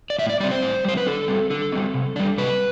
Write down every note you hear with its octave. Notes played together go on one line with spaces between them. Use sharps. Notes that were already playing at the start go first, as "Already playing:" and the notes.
D5
A2 E5
D5
G3 C4 D5
C5
A2
G3 C4 C5
B4
D3 A4
G3 C4
D3 A4
G3 C4
C3
G3 D4
C3 B4